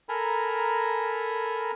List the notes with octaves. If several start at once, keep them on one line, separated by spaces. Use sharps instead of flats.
A4 A#4 G#5 A#5 B5